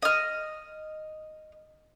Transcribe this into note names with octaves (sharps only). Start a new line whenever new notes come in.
D#5 F6